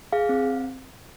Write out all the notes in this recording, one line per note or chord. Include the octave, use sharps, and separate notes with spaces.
G#4 F5
C4